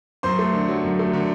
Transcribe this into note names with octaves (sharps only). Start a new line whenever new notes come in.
F#2 C5 C6
A3
D3
F#3
F#2
A3
D3